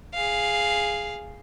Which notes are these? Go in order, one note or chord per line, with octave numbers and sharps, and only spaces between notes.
G#4 F5